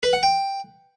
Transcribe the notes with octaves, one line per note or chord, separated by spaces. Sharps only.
B4
F#5
G5